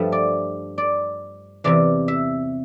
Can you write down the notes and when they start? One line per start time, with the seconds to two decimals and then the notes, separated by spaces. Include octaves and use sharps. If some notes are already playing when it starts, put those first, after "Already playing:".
Already playing: G2 F3 A3
0.12 D5
0.78 D5
1.64 E2 C3 E3 D5
2.08 E5